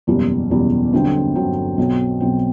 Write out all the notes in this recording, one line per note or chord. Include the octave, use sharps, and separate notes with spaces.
F#1 E2 B2 G3
F#1 E2 B2 G3
G1 G2 D3 F#3 C4
G1 G2 D3 F#3 C4
B1 B2 F#3 C4
B1 B2 F#3 C4